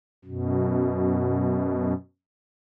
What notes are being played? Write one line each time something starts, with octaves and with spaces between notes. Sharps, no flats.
F#2 B2